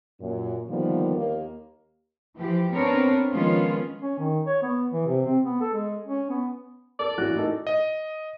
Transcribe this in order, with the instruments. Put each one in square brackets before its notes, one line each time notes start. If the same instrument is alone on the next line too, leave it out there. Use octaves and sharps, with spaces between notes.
[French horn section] F#2 A#2
D3 D#3 F3 G3 A#3 B3
D#2 A#3
[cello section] E3 F3 G4
B3 C4 D4 A#4 B4 C#5
D#3 F3 G#3 B3 C#4 F4
[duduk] C#4
D#3
C#5
B3
E3
C3
C4
B3
A4
G#3
C#4
B3
[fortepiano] A4 [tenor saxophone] D5
[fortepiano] A1 F#4 F#6
A2 D#4 A4
[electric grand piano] D#5